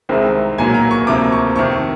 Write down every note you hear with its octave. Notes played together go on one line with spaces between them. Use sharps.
C2 C3 D#3 G#3 C4
A#2 F#3 A#3 G#5
A#5
C#6
D2 C3 F3 A#3 D6
C#6
F2 C3 D#3 C#6